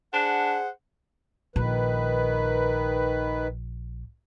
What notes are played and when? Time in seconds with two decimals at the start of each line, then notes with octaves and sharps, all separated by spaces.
0.14 D4 G#4 C5 F#5
1.56 A#1 D#3 B4